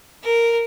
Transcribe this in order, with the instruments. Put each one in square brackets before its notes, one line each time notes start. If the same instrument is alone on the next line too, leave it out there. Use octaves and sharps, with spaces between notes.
[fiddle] A#4